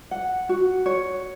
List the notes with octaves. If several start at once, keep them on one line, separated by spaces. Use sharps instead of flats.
F#5
F#4
C#5